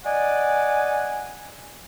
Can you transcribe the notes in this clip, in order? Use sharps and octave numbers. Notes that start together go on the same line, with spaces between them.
D5 D#5 F#5 G#5